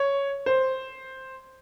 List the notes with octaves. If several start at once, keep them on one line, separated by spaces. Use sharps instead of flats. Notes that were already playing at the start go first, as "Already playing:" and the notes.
Already playing: C#5
C5